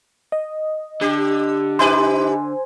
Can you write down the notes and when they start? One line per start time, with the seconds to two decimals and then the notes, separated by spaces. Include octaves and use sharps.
0.32 D#5
1.01 D3 G4
1.79 D#4 G4 B4 C5 G#5